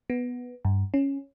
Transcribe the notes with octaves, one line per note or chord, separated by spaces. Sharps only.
B3
G2
C#4